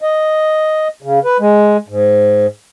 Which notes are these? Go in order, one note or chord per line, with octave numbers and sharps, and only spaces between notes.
D#5
C#3
B4
G#3
G#2